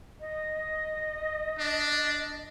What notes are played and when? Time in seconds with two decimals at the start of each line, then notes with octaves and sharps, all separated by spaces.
0.20 D#5
1.59 D4